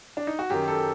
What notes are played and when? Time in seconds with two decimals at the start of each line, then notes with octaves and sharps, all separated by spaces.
0.17 D4
0.27 D#4
0.39 F#4
0.50 F#2 D#3 G4
0.68 A4